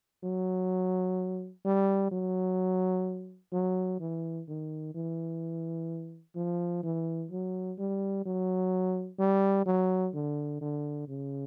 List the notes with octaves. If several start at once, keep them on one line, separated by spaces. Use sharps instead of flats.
F#3
G3
F#3
F#3
E3
D#3
E3
F3
E3
F#3
G3
F#3
G3
F#3
D3
D3
C#3